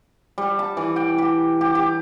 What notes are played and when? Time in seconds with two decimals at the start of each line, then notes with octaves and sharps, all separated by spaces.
0.38 G3
0.59 A5
0.77 E3
0.96 G5
1.18 G4
1.61 G4
1.75 G4